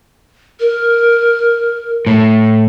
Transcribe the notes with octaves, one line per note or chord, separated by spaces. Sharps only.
A#4
A2